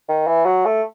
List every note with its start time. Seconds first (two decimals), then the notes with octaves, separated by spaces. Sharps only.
0.09 D#3
0.27 E3
0.45 F#3
0.65 A3